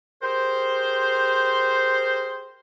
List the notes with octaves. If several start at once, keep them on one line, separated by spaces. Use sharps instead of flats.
G4 G#4 A#4 C5